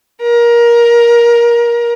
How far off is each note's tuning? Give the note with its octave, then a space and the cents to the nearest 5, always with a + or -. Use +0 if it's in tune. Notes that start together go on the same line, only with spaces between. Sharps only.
A#4 +20